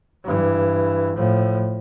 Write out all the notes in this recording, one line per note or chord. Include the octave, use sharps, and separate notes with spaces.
G2 E3
A2 F3